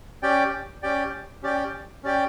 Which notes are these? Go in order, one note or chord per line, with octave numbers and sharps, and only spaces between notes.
C#4 G4 D5 G5
C#4 G4 D5 G5
C#4 G4 D5 G5
C#4 G4 D5 G5